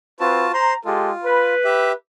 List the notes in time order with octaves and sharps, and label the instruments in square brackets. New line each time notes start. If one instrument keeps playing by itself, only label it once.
[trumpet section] C4 B4 [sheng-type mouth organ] F4 F#4 A5
[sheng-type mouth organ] C5 C6 [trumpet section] A#5
[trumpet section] G#3 G4 A4 [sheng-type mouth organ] F4
[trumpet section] B4
[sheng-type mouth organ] G4 E5